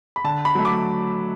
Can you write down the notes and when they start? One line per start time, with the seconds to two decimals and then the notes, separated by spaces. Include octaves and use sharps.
0.16 B5
0.24 D3 A5
0.45 B5
0.55 F#3 A3
0.65 D6